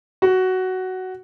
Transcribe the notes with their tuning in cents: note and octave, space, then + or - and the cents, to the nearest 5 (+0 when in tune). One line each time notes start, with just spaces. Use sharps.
F#4 +10